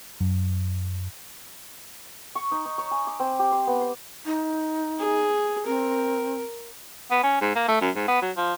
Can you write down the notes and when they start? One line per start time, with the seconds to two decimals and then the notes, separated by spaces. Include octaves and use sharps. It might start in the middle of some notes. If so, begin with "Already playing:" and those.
0.20 F#2
2.35 C#6
2.51 D#4
2.65 D#4
2.78 C#5
2.91 G#5
3.07 D6
3.20 C4
3.39 G4
3.52 C5
3.67 B3
3.81 C5
4.25 D#4
4.99 G#4
5.66 C4 A#4
7.11 B3
7.23 C#4
7.41 G#2
7.56 A#3
7.68 A3
7.81 F#2
7.96 G#2
8.08 B3
8.22 F#3
8.37 F3